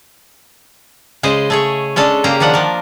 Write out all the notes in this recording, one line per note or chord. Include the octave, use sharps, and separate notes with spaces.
C#3 G#3 C5 D#5
A3 G#4 C#5
G#3 C#4 D4 A4
C#3 A#3 G4 A#5
D#3 F3 D4 F#5
F3 A#4